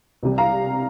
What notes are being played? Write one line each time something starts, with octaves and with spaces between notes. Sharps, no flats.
C2 C3 G3
F5 A#5